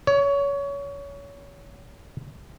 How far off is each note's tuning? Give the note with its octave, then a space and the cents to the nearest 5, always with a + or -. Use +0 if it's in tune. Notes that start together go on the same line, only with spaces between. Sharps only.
C#5 +25